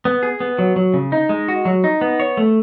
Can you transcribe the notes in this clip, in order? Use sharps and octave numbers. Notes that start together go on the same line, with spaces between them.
B3
G#4
B3
F#3
F#3
C#3
D#4
G#3
F#4
F#3
D#4
B3
C#5
A3